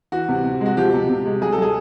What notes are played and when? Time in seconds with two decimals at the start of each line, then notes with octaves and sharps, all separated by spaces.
0.12 E3 F#4
0.29 C3
0.44 C3
0.61 G#3 F#4
0.77 F3 G4
0.93 C3
1.10 C3
1.26 G#3
1.42 F#3 G#4
1.52 A4
1.58 F#3 G#4